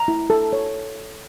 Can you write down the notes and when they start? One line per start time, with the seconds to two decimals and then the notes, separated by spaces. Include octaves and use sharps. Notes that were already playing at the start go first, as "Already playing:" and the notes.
Already playing: A#5
0.08 E4
0.30 A4
0.53 C#5